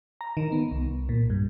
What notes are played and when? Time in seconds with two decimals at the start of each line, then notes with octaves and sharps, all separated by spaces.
0.21 A#5
0.37 D#3
0.52 B3
0.71 C2
1.09 A#2
1.30 G2